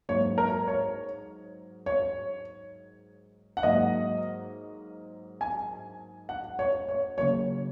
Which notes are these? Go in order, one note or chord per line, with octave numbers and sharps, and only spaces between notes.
G#2 F#3 A#3 C#5
A#4
C#5
C#5
F#5
G#2 F#3 A#3 D#5
G#5
F#5
C#5
C#5
C#3 F#3 A#3 C#5